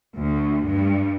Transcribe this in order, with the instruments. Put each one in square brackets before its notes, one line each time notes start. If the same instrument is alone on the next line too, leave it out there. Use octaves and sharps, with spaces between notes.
[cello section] D2
G2